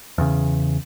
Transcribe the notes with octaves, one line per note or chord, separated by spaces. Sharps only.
E2 C#3